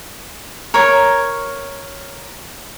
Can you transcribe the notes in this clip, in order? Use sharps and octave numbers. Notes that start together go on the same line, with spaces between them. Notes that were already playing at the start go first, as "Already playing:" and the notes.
A#4 C#5